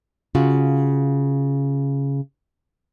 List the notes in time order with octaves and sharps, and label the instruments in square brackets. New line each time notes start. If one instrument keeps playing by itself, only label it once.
[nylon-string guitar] C#3 F4 F#4